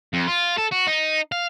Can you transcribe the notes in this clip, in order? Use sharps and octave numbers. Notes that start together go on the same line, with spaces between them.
F2
F4
A4
F#4
D#4
F5